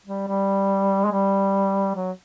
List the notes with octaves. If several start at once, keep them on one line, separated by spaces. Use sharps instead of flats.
G3
G3
G#3
G3
F#3